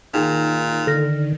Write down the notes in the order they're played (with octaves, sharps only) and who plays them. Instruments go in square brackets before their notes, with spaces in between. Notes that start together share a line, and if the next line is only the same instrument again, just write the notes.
[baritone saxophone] A#2 [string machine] D#3 [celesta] D#4 G#4 G5
[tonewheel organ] D3 [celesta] F6 A#6